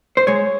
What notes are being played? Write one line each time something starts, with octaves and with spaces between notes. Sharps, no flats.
C5
G#3 C#5